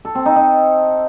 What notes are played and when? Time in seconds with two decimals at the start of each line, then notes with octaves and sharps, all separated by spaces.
0.05 A4
0.15 C4
0.26 D#4
0.36 D#4